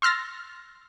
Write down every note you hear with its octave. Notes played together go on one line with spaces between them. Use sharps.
C6 E6 F6 A6 A#6